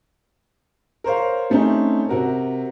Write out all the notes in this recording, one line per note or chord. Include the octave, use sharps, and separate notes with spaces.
A#4 C5 C#5 F5
G3 A3 C4 C#4 D#4
C3 F#4 A#4